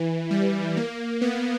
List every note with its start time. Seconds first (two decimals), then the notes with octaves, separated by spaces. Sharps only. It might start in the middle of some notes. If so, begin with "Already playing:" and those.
Already playing: E3
0.31 G3
0.77 A#3
1.21 B3